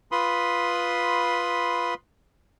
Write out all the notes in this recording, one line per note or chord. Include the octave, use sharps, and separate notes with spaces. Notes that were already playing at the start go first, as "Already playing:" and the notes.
F4 B4 B5 C6 D#6